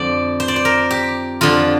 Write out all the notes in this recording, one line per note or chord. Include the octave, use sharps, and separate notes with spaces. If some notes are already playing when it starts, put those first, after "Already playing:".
Already playing: F2 D3 C5 D5
C5
D5
C5
A#4
G4
F2 D3 F4